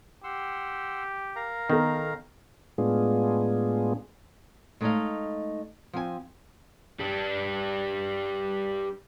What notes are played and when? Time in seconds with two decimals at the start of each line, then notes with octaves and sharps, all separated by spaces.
0.24 G4 F#5 C6 E6
1.36 A#4 F5 A#5
1.70 D#3 B3 A4
2.78 A2 G#3 B3 D4 F4 G#4
4.81 G#3 A3 D#4 C#5 D#5 F5
5.93 F3 C4 G#5
7.00 G3 D4